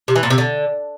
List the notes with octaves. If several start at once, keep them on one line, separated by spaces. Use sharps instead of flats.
C3
E3
A#2
C3
D3